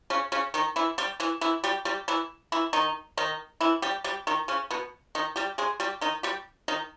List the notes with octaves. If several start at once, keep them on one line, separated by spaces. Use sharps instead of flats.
C#3 C#4
C#3 C#4
D#3 D#4
E3 E4
G3 G4
E3 E4
E3 E4
G3 G4
G3 G4
E3 E4
E3 E4
D#3 D#4
D#3 D#4
E3 E4
G3 G4
G3 G4
D#3 D#4
C#3 C#4
B2 B3
D#3 D#4
G3 G4
G#3 G#4
G3 G4
D#3 D#4
G3 G4
D#3 D#4